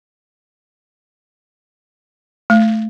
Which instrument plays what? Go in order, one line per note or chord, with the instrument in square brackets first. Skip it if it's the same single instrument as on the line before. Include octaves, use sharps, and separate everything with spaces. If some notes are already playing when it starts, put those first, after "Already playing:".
[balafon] A3